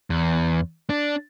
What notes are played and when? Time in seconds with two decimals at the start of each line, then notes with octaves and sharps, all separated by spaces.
0.10 E2
0.90 D4